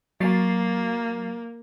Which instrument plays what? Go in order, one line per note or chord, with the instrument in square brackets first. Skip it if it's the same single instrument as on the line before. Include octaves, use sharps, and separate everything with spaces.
[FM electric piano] F#3 A6 C7 [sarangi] A#3